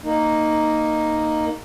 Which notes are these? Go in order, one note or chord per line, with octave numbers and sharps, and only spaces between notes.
A#3 D#4